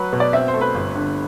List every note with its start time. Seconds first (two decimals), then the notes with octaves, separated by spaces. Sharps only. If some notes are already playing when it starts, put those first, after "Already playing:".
Already playing: F#3 B4
0.13 B2
0.20 D5
0.33 C4 E5
0.48 C5
0.54 A3
0.61 B4
0.75 G1
0.95 D3